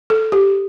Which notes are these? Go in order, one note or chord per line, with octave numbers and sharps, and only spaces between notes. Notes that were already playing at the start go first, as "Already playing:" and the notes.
A4
G4